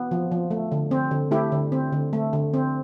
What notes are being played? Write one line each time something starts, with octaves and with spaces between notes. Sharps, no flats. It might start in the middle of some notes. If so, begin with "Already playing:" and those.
Already playing: B3
F3
F3
A3
D3
C4
D3
A3 E4 G4
D3
C4
D3
A3
D3
C4